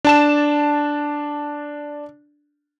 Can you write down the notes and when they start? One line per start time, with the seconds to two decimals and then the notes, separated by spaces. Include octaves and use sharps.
0.05 D4 A5 E7